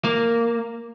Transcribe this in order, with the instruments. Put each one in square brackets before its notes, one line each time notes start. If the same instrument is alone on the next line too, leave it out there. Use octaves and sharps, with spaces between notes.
[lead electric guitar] A#3